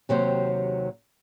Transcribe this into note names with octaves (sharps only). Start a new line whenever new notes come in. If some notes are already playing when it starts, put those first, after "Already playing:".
D#2 C3 F#3 C4 C5